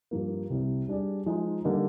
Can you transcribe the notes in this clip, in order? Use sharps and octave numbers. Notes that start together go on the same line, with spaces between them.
G2 F3 A#3
C2 C3 G3
G3 D4 G#4 D5
F3 G#3 D#4
D3 G3 A#3 D#4